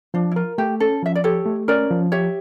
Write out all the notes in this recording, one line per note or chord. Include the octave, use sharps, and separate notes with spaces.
F3 D4
E4
F4 A#4
A3 G4
C#4 A4
F3 E5
D5
G4 A4 C#5
A3
C#4 A#4 D5
F3
G4 C#5 E5